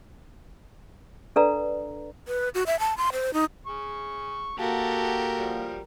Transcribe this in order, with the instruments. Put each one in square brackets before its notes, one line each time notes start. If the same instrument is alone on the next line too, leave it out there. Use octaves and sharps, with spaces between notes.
[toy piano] D4 A4 B4 D5 F5 A#5
[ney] B4
F#4
E5
A5
C6
C5
D#4
[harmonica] G#4 C#6
[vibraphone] A#3 F5 F#5 [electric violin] F#4 A4 [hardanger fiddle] G4 A#4 [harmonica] A5
[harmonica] F3 G3